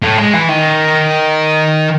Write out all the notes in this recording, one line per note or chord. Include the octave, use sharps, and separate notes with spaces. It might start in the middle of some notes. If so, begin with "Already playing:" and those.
A2
G#3
E3
D#3